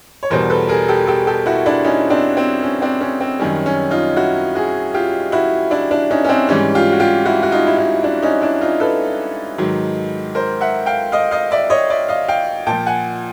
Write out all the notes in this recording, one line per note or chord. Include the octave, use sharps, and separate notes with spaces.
C#5
E2 B2 G3 A#4 C5
A4 B4
G#4 A#4
G4 A4
G4 A4
G4 A4
E4 F#4
D4 E4
C#4 D#4
C4 D4
C4
C#4
C4 D4
C#4
C4
F#2 D#3 G3 C#4
C#4
D#4 F4
E4 F#4
F#4 G#4
F4 G4
E4 F#4
D4 E4
D4 E4
C#4 D#4
C#4
C4 D4
G#2 E3 G3 C#4
F4 G4
F#4
F4 G4
E4 F#4
F#4
D#4 F4
E4
D#4 F4
D4 E4
C#4 D#4
D4 E4
D#4 F4
A4 B4
G#2 D#3 F#3
A#4 C5
E5 F#5
F5 G5
D#5 F5
D#5 F5
D5 E5
C#5 D#5
D5 E5
D#5 F5
F5 G5
A#2 G5 A5
F3
F#5 G#5